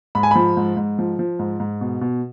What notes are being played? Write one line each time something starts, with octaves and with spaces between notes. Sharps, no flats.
G#2 B5
G#5
F3 B5
G#2
G#2
F3
F3
G#2
G#2
B2
B2